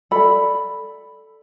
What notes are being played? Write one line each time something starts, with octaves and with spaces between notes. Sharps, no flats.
A4 D5 B5